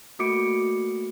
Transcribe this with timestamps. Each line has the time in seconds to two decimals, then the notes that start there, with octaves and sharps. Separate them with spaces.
0.19 A3 A#3 F#4 D6 C#7 D7